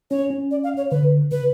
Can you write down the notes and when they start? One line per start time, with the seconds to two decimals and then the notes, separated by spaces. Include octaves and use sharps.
0.11 C#4 C#5
0.30 C#4
0.51 D5
0.64 F5
0.77 C#5
0.91 D3 B4
1.31 C#3 B4